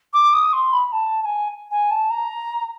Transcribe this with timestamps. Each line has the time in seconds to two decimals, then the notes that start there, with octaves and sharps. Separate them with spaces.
0.13 D6
0.33 D#6
0.53 C6
0.72 B5
0.92 A5
1.21 A5
1.25 G#5
1.71 G#5
1.90 A5
2.10 A#5